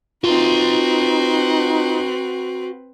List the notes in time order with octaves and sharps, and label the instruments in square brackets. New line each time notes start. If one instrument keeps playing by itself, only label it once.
[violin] C4 B4 [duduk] D#4 [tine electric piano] F4 [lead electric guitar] F#4 C6